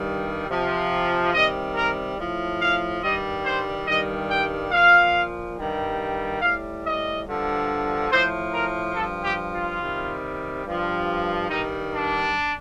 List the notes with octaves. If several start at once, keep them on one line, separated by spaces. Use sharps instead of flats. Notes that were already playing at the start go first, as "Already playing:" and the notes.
Already playing: G2 D#3 G3
C3 F3
C3 D#3 G3 D#5
A#4
A2 F3
F5
G2 D#3 G3 D#5
C5
G2 D#3 G3 D#5
G5
A#2 F3 F5
G2 D#3 G3
A2 G3 F5
D#5
G2 D3 F3
A2 F3 C5
A#4
G2 A4
F3
G4
F4
C3 D#3 G3
G2 F3
G2 D#3 G3 D#4
D4